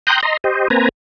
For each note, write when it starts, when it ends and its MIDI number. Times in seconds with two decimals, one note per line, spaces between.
0.07 0.21 79
0.07 0.21 82
0.07 0.21 84
0.07 0.21 87
0.07 0.21 90
0.07 0.21 91
0.23 0.37 75
0.23 0.37 82
0.23 0.37 84
0.44 0.68 67
0.44 0.68 72
0.44 0.68 75
0.70 0.89 58
0.70 0.89 60
0.70 0.89 71
0.70 0.89 80
0.70 0.89 82